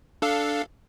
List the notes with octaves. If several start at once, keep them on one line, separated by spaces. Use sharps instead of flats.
D4 A4 F5